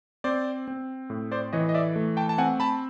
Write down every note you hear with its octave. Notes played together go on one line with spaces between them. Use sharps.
C4 C5 D5
C4
A2
C5 D5
E3 C#5 D#5
D#5
D5 E5
A3
G5 A5
A5
C4 F#5 G#5
A5 B5